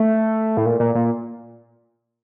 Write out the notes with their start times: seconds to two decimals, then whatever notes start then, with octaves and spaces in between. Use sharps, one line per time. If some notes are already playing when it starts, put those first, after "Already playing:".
Already playing: A3
0.57 A2
0.66 A#2
0.80 A#2
0.95 A#2